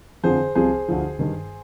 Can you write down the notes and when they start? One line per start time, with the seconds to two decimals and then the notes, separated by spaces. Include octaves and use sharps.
0.24 F2 D3 F3 G#4 C5
0.55 C2 C3 F3 G#4 C5
0.88 D2 D3 F3
1.19 G2 D#3